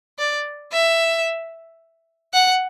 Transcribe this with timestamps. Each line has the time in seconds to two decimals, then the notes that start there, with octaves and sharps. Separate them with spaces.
0.19 D5
0.73 E5
2.34 F#5